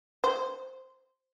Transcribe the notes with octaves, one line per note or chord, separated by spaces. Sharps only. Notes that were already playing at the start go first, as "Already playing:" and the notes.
C5